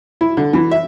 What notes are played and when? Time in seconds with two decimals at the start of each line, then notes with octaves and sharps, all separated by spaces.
0.21 E4
0.37 D3
0.53 E3
0.71 E5